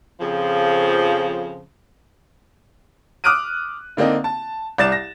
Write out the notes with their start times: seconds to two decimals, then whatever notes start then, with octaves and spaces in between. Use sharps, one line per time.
0.20 F2 C#3 F3
3.24 D6 D#6 F6 F#6 D7 D#7
3.97 D3 A#3 C4 D4 D#4
4.24 A5
4.78 C2 D5 A6 E7
4.92 A#6